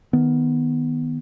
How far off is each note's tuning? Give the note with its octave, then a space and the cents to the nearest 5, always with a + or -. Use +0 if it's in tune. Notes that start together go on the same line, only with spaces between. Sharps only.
D#3 +0 B3 +0